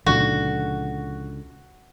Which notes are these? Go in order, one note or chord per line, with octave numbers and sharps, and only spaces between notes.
C#2 A#2 D3 F3 F#4